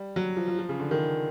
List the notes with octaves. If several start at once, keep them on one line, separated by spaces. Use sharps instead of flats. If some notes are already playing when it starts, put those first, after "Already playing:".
Already playing: G3
F#3
F3
F3
F3
C#3
D3
D#3